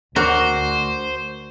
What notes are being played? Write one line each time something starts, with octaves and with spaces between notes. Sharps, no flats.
D2 F#4 A#4 C5 D5 D6